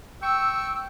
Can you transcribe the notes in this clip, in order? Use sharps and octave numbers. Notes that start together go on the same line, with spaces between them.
G5 C#6 E6